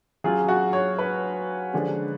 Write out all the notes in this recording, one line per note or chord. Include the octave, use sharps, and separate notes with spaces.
F#3 C#4 F4 G#4
F#4
C#5
B4
D3 F3 G#3 C#4